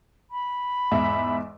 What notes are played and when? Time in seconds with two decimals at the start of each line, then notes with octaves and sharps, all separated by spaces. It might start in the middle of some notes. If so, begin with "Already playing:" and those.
0.30 B5
0.91 E2 G#2 E5